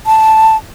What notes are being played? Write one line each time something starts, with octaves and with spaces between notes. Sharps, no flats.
A5